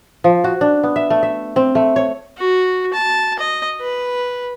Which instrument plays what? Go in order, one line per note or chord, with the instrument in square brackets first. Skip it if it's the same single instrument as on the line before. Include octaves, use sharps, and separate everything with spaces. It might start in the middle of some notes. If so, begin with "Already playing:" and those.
[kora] F3
F#4
D4
B3
E5
A3
E5
C4
A3
C#5
[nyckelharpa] F#4
A5
D#5
B4